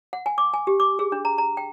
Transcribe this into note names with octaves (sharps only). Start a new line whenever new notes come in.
F#5
G#5
D6
G#5
G4
D6
G#4
D4
A#5
A#5
G5